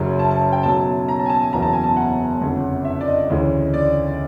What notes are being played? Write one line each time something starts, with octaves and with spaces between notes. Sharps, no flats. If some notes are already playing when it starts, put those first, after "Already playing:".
Already playing: F#1 F#2 C#3 F#3
A5
A5
G5
B1 B2 F#3 A5
A#5
A5
G#5
A5
G#5
F#1 E2 B2 F#3 A#5
A5
G#5
A5
F#5
G1 F2 C#3
E5
D5
D#5
D2 C#3 E3
D5